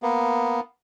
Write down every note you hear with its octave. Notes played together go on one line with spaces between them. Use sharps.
A#3 B3